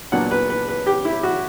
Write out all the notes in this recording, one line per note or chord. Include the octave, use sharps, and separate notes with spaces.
A#2 F#3 B3 D4 F#5
B4
B4
B4
G4
E4
F#4